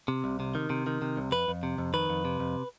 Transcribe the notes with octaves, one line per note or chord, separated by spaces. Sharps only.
C3
C2
C3
D#3
C3
D#3
C3
C2
F2 B4
F2
C3
F2
D#3 B4
F2
C3
F2